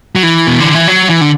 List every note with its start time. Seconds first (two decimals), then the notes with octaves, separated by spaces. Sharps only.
0.15 F#3
0.23 E3
0.47 B2
0.60 D3
0.74 E3
0.88 F#3
1.09 E3
1.21 D3